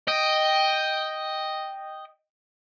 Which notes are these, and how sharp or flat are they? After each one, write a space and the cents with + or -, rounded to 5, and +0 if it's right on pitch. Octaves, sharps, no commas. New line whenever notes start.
D#5 +0 G5 +0